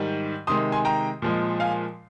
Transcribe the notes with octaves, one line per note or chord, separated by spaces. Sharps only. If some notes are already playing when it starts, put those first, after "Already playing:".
Already playing: G#2 D#3 G3
C3 D#3 G#3 C6 D#6
G#5 C6
G5 A#5
A#2 F3 G#3
F5 G#5